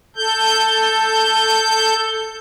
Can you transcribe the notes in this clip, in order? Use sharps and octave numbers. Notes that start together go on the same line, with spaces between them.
A4 G6